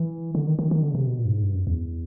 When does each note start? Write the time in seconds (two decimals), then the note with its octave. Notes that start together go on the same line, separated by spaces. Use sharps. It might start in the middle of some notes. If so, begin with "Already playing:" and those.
Already playing: E3
0.35 D3
0.47 D#3
0.59 D#3
0.71 D#3
0.83 D3
0.91 C#3
0.95 C3
1.07 B2
1.19 A#2
1.26 G2
1.31 G#2
1.43 G2
1.54 F#2
1.67 E2